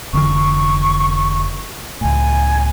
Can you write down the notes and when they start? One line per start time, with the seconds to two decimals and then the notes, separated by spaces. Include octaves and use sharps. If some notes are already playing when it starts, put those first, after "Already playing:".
0.13 F1 D3 E3 C#6
2.01 C#2 A2 G#5